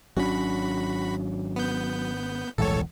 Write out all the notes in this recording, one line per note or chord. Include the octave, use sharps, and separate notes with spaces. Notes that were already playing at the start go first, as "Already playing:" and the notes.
G#1 F#3 C#4 D4 F#4 B5
B3 G6
D#1 B1 A2 E3 G#3 A4 C#5